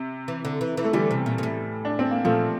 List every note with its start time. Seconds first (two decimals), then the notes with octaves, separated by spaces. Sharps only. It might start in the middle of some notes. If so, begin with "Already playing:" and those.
Already playing: C3
0.28 E3
0.45 D3
0.61 E3
0.77 E3
0.84 A3
0.93 D3 E3 G3
1.11 C3
1.26 A#2
1.38 A#2
1.43 A2
1.85 D4
1.99 C4
2.11 A#3
2.25 A#2 F3 A3